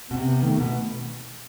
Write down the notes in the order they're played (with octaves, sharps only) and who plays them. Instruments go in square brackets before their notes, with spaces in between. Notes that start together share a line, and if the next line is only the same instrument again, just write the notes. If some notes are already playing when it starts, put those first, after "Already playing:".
[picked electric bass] B2 [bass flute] C4
[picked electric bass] C3
[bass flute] B3
[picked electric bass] D#3 [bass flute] A3
[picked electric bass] B2 [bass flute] B3